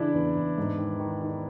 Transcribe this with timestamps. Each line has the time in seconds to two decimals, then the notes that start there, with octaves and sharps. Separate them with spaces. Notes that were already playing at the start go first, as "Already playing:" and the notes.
Already playing: C#3 E3 D4 E4
0.14 E2
0.35 E2
0.58 G#2
0.78 D#3
1.00 D#3
1.21 D#3